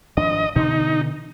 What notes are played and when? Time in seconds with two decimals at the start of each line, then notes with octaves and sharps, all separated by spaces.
0.17 G#1 F3 D4 D#5
0.56 B2 D3 E3 D#4